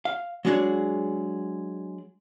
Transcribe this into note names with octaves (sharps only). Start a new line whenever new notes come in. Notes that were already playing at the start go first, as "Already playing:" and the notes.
F5
F#3 G#3 D4 F#4 G#4